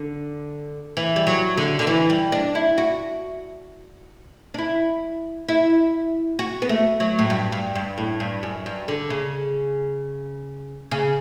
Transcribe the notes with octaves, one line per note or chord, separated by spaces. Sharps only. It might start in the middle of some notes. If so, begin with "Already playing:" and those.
Already playing: D3
E3
G3
F#3
D3
D3
E3
G3
D4
E4
F#4
D4
E4
E4
F#4
B3
A3
F#3
A2
G2
G2
G2
A2
G2
F#2
G2
D3
C#3
C#3